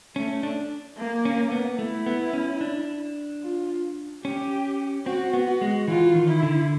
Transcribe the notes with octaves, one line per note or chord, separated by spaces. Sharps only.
A3 C#4
D4
A#3
C#4
B3
A3 E4
B3
C#4
D4
F4
C#4 G4
C4 F#4
B3
F#4
G#3
E3 F4
D#3
E4
D3